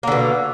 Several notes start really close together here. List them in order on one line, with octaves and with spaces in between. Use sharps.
A#3 D3 B2